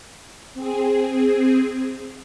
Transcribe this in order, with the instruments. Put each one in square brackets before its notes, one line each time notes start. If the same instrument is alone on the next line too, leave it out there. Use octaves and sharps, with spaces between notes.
[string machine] C4 G#4